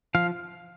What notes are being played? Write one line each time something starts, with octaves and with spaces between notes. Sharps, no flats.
F3 F5